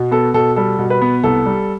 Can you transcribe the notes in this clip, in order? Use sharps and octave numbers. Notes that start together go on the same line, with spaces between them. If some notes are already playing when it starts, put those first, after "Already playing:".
Already playing: B2
B3 A4
B2 A4
G3 A4
B2
B4
B3
C2 A4
G3